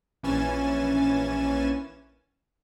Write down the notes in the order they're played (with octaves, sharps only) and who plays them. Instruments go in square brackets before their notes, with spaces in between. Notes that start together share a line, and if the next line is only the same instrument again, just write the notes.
[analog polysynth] A#1 E3 C#4 G#5 A6 E7